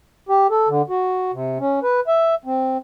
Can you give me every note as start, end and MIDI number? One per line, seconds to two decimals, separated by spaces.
0.29 0.47 67
0.50 0.68 69
0.69 0.82 50
0.89 1.31 66
1.33 1.58 48
1.60 1.80 61
1.83 2.00 71
2.07 2.35 76
2.46 2.78 60